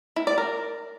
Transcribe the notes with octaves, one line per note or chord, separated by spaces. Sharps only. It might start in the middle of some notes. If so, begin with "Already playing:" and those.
E4
D5
A#4